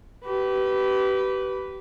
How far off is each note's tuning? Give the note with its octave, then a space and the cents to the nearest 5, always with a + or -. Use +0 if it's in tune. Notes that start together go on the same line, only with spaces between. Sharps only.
G4 -30 B4 +0